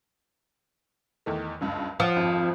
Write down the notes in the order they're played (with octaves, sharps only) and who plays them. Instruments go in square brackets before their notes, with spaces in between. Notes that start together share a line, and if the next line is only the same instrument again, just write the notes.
[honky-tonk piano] E2 D#3 A3
F#1 C#2 G2
[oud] F3 [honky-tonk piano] F#5 D#6
[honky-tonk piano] G#1 F2